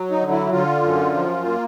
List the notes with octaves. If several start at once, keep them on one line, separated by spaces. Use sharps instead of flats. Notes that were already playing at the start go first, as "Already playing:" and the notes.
Already playing: F#3
D#4
D3
E4
D3 F4
F#2
F3
A#3